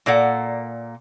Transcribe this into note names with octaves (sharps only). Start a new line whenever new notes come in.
A#2 A#3 A4 D5 F#5